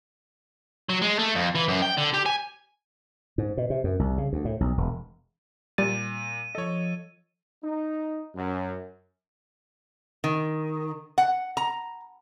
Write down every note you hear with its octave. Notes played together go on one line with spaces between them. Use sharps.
F#3
G#3
A3
F2
E3
F#2
G5
D3
G4
G#5
G#2
B2
C3
F#2
C2
C#3
D2
A2
B1
E1
A#2 G3 A6 D#7
F3 A4 C#5 D#5
D#4
F#2
D#3
F#5
A#5